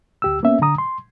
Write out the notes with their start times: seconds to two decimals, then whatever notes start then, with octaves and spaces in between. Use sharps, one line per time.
0.22 D2 G4 E6
0.43 A#3 B3 C#4 E5
0.62 D3 A#5 D#6
0.78 C6